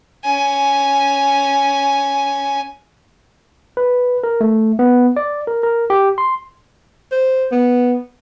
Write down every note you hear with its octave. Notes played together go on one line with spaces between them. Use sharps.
C#4 G#5
B4
A#4
A3
B3
D5
A#4
A#4
G4
C6
C5
B3